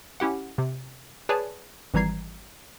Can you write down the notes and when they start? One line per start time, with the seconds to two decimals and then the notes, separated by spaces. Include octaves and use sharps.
0.20 C#4 E4 G4 F#5
0.58 C3
1.29 G#4 B4 C#5 D5 G#5 A5
1.94 G#1 E3 G3 A#5 G#6 C7